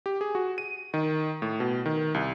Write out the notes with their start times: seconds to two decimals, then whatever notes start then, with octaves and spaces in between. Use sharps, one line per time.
0.06 G4
0.21 G#4
0.35 F#4
0.58 D#7
0.94 D#3
1.42 A2
1.60 B2
1.86 D#3
2.14 C2